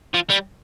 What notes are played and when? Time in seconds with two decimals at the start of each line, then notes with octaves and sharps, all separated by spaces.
0.14 F3
0.30 G3